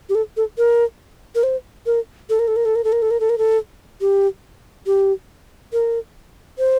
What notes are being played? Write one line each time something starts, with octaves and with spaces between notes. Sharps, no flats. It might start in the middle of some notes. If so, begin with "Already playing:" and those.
G4
A4
A4
A#4
A#4
C5
A#4
A4
A#4
A4
A#4
A4
A#4
A4
A#4
A4
A#4
A4
A#4
A4
G4
G4
A#4
C5